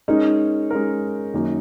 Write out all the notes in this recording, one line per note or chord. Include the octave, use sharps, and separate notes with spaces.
G#3 C#4 D#4 A#4
G#3 C#4 A#4
F#2 D#3 A#3 F#4